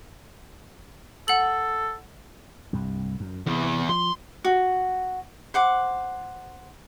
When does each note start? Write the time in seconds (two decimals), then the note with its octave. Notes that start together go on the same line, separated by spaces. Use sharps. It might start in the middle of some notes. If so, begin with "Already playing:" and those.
1.28 A4 F#5 F#7
2.73 C2 G2
3.20 F#2
3.46 E2 C3
3.89 F3 C6
4.44 F#4
5.54 C5 F#5 D6